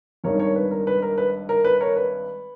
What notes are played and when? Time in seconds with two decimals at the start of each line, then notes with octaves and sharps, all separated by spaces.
0.24 G#1 G2 D#3 A#4 C#5
0.39 A#4 C#5
0.56 B4
0.71 A#4
0.87 B4
1.02 A#4
1.18 B4
1.49 A#4
1.65 B4
1.80 A#4 C#5
1.96 B4